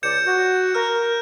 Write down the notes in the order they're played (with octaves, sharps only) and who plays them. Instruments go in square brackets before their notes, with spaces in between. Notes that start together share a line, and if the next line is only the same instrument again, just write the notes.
[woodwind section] C#2 D5 [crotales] G6 C#7 E7
[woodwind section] F#4
[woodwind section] A#4 [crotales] F6